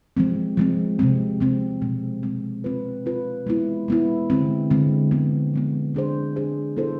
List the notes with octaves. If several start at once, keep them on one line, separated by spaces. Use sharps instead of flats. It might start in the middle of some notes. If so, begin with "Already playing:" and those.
F3 G#3 C4
F3 G#3 C4
C3 F3 G#3 C4
C3 F3 G#3 C4
B2 G#3 C4
B2 G#3 C4
C4 F4 B4
C4 F4 B4
G#3 B3 E4
G#3 B3 E4
D3 G#3 C4
D3 G#3 C4
F3 G#3 B3
F3 G#3 B3
G#3 D4 G#4 C5
G#3 D4 G#4 C5
B3 E4 A4 C5